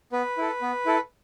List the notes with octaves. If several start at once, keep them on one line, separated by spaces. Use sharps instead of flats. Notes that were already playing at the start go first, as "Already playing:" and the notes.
B3 B4
E4 A4
B3
E4 A4